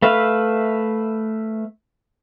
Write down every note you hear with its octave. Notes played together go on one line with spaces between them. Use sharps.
A3 B4 E5 F5